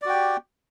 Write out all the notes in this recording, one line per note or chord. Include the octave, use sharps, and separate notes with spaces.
F#4 G4 D5 G5